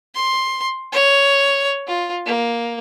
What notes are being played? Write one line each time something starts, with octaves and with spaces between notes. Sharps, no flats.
C6
C#5
F4
A#3